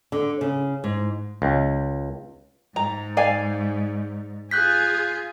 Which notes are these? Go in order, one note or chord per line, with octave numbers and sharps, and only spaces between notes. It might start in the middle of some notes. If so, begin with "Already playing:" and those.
D3
C#3
G#2
C#2
G#2 A#5
D5 F5 G#5
F4 G#4 F#6 G6 B6